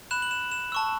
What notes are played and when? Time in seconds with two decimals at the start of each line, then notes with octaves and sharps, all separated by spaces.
0.11 B5 F#6 E7
0.22 F#7
0.31 E7
0.52 E7
0.72 A5 C#6 E6